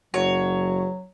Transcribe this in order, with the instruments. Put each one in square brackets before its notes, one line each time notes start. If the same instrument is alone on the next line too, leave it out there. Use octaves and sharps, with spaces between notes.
[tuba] F#1 [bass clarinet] F#3 [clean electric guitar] F#4 [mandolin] C#5